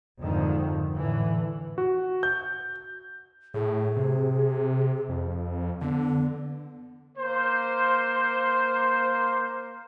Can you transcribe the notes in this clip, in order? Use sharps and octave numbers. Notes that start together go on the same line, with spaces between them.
F2 G#2 D3 D#3 F3
A2 D3 E3
F#4
G6
A2 G#4
C3
F2
D3 B3
A#3 C5